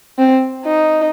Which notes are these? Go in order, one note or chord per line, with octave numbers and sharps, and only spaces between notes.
C4
D#4